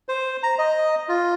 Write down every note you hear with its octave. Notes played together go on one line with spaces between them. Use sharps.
C5
A#5
D#5
F4